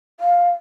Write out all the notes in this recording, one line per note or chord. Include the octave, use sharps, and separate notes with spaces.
F5